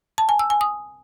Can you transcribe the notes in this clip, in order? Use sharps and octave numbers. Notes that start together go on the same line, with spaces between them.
A5
G#5
E6
G#5
D#6